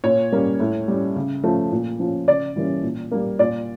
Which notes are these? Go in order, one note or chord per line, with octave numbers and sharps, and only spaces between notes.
A#2 C#5
G3 A#3 C#4
A2
G3 C#4
C#3
F3 A3 C#4
A#2
F3 C#4
C#3 D5
E3 G3 A#3 C#4
A#2
G3 A#3
A#2 D5